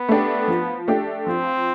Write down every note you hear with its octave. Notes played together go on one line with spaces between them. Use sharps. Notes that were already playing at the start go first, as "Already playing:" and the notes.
Already playing: B3
A3 D4 G4
F3
A3 D4 G4
F3 C4